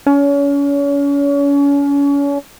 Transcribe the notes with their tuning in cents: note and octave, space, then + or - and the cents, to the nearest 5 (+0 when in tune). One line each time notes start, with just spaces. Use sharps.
C#4 +35